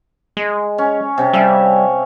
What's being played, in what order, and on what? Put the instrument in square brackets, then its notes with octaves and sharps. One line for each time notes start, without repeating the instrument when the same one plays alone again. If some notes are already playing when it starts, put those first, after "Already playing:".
[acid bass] G#3
[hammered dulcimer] C#4
C3 C#4
[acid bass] G3 [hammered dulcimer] E5 F5